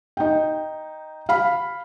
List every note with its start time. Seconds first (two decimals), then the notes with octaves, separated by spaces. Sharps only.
0.17 D#4 G5
1.29 F5 B5